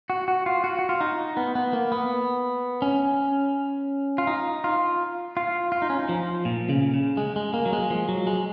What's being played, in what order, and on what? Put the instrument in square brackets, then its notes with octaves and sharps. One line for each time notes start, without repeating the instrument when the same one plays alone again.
[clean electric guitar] F#4
F#4
F4
F#4
F#4
F4
D#4
B3
B3
A#3
B3
C#4
F4
D#4
F4
F4
F4
D#4
C#4
D#4
F3
A#2
C#3
C#3
G#3
G#3
A#3
F#3
G#3
F3
F#3
G#3